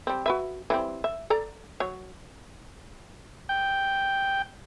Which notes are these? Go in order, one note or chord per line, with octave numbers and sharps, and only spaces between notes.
G3 C4
F#4 B4 E5
E3 G3 C4
E5
A4 D5 A#5
F#3 C#5
G5